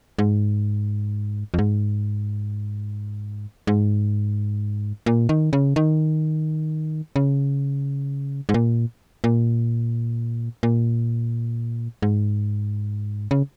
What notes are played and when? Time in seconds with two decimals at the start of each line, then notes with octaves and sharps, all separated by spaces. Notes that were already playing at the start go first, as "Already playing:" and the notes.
0.19 G#2
1.54 F2
1.59 G#2
3.67 G#2
5.06 A#2
5.29 D#3
5.53 C#3
5.76 D#3
7.16 C#3
8.49 G#2
8.54 A#2
9.24 A#2
10.63 A#2
12.02 G#2
13.31 C#3